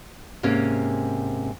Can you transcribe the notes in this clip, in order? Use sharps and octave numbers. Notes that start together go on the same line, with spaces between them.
G#2 C3 A#3 C#4